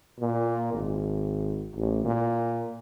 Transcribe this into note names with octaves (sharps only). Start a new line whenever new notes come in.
A#2
G#1
A1
A#2